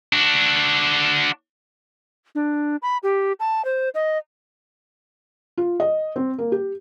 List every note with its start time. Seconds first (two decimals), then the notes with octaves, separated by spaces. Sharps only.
0.13 D4 F#4
2.35 D4
2.82 B5
3.03 G4
3.40 A5
3.65 C5
3.94 D#5
5.58 F4
5.80 D#5
6.16 C4
6.38 A#3
6.52 G4